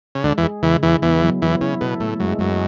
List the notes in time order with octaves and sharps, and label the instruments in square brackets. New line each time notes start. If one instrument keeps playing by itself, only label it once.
[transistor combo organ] C#3
[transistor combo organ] D2 D3 [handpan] G#3
[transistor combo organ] E2 E3
[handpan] G#4
[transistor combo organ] E2 E3 [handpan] C#3
[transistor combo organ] E2 E3 [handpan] E4
[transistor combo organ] E2 E3 [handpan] B3
[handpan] F#3
[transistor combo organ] E2 E3 [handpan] E4
[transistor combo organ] C#3 [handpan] E4
[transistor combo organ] B2 [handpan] A4
[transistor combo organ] A2 [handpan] A3
[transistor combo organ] F#2 [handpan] G#3
[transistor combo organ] F#2 [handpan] G#3